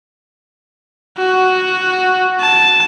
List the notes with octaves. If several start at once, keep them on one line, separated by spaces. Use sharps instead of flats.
F#4
A5